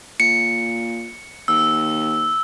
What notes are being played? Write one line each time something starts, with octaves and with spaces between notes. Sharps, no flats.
A#2 C#7
D#2 E6